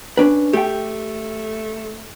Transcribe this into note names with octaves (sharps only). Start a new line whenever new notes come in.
C#4 D4 B4
A3 G4 G5